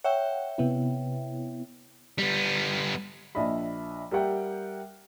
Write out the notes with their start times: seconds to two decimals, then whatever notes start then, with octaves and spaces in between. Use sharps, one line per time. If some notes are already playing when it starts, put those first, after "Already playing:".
0.04 C#5 E5 F#5 G5
0.58 C3 B3 E4
2.19 G3 B3
3.35 A#1 D4 D#5 E5 B5
4.11 G3 A#4 E5 F#5 G5